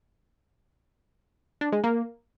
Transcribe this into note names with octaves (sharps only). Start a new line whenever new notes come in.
D4
G#3
A#3